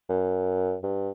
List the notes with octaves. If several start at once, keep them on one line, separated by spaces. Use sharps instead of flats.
F#2
G2